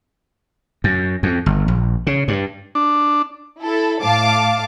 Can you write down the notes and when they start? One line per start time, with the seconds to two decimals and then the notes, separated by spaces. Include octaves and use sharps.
0.84 F#2
1.23 F2
1.46 G1
1.68 A#1
2.07 C#3
2.28 G2
2.75 D4
3.62 E4 A4
4.03 A2 F5 A5 D6